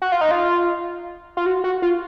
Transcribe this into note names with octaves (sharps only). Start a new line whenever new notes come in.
F#4
F4
D#4
F4
F4
F#4
F#4
F4